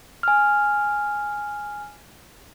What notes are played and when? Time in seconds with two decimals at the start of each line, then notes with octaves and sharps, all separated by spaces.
0.23 G#5 F6